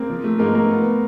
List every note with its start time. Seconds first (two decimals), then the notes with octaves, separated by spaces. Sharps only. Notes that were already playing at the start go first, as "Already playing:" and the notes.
Already playing: A#3 C4 A#4
0.10 F3
0.24 A3
0.39 G#2 A#3 A#4
0.55 A3 A#3 A#4
0.71 B3